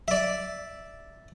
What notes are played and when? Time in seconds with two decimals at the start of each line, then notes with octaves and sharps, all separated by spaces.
0.08 D5 E5